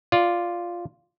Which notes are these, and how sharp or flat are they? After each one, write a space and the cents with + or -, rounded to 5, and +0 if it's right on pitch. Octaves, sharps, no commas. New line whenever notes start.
F4 +0 D5 +0